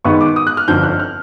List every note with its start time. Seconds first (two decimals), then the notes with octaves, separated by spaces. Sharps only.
0.05 G#2 D#3 G#3 B3 C#6
0.21 D6
0.36 D#6
0.47 F#6
0.57 F6
0.68 G1 F2 D3 G6
0.83 F#6
1.00 F6